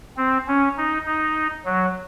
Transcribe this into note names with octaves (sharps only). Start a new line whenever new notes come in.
C4
C#4
D#4
D#4
F#3